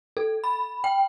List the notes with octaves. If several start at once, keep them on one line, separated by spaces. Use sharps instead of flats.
A4
B5
G5